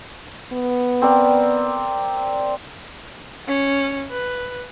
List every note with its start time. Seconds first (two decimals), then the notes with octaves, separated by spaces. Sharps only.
0.52 B3
1.02 C4 A#4 D5
3.48 C#4
4.11 B4